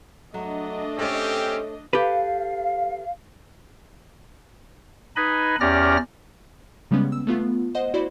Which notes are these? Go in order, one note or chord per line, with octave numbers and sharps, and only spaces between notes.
F#3 A3 D4 D#5
C4 C#4 G4 A4 C#5
G4 A4 B4 F5
D#4 B4 D#5 G#5 B5
E2 C#4 G4 D5 F6 A#6
C#3 G3 G#3 B3 C#4
E6
A3 B3 F4
C5 D#5 F#5
E4 F#4 C5 D5 B5